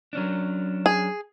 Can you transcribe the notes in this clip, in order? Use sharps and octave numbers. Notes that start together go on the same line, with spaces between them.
F#3 C#4 D4
G#4